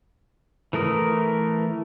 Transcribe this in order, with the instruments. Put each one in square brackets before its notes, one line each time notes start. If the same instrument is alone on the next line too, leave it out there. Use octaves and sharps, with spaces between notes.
[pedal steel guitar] E3 A3 A#4 D#6